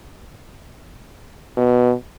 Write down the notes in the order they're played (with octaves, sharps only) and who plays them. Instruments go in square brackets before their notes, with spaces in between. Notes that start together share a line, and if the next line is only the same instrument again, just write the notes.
[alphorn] B2